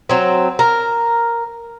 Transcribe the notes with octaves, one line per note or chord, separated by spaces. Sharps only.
F#3 C4
A#4